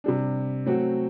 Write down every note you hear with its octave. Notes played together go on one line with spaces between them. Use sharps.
C3 G3 D4
F#3 A3 C4 F#4